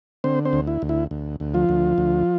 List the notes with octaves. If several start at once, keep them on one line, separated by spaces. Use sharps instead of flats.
D3 C4 C5
C4 C5
D2
E4
D2
E4
D2
D2
F3 F4
D2
D2